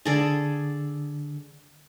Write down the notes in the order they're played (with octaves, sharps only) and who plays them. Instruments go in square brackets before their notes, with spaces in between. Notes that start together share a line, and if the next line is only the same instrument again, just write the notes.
[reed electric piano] D3 D4 [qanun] G#4 A4 D5